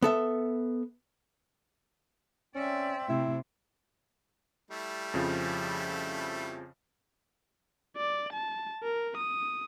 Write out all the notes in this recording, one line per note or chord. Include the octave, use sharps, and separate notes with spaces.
B3 A4 E5
C4 C#4 D5 E5
C3 A3 E4
G3 A3 E4
F2 C#3 F3
D5
A5
A#4
D#6